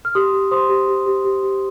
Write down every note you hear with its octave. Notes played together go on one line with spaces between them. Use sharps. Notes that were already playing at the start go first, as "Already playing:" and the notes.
F6
G4 C6 D#6
G4
C5 C6 D#6
G4
G4
G4
G4
G4